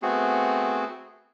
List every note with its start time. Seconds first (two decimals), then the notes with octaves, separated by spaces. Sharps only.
0.02 A3 B3 C4 F#4 G#4